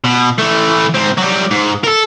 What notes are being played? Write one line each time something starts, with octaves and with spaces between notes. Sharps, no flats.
B2
E3 A3
G#2 C4
F#3 G3
G#2
A4 A#4